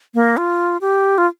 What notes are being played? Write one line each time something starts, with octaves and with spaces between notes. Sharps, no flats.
A#3
F4
G4
F4